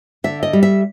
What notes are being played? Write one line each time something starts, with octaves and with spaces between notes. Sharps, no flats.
D3 E5
D#5
G3
E5